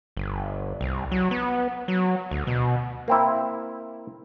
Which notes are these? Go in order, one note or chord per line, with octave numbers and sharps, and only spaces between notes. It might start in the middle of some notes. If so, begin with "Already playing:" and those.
G1
C2
F#3
B3
F#3
D2
B2
A#3 C4 E4